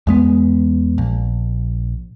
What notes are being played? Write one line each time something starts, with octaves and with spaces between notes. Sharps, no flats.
E2 G#3 B3
A#1